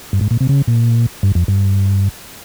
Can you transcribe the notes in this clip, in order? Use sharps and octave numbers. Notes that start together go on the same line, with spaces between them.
G2
G#2
A#2
C3
C#3
A#2
G2
F2
G2